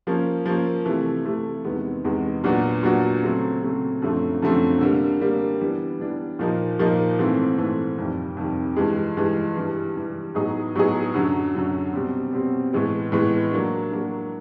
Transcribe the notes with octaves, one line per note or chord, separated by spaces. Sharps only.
F3 A#3 C#4
F3 A#3 C#4
C3 E3 A3
C3 E3 A3
E2 C3 D#3 G#3 B3
E2 C3 D#3 G#3 B3
A#2 F#3 B3 D4 F#4
A#2 F#3 B3 D4 F#4
C#3 F#3 A3 C4
C#3 F#3 A3 C4
F#2 D3 F3 A3 C4
F#2 D3 F3 A3 C4
D3 G3 A#3
D3 G3 A#3
E3 G3 B3 D4
E3 G3 B3 D4
A#2 F3 A#3 D#4
A#2 F3 A#3 D#4
G#2 E3 A3 C4
G#2 E3 A3 C4
F2 C3 D#3 G3
F2 C3 D#3 G3
G2 E3 G#3
G2 E3 G#3
G2 E3 G3
G2 E3 G3
A2 F#3 B3 D#4 G#4
A2 F#3 B3 D#4 G#4
F#2 D3 F#3
F#2 D3 F#3
B2 G3 C4
B2 G3 C4
A2 E3 G#3 B3
A2 E3 G#3 B3
F#3 A#3 D4
F#3 A#3 D4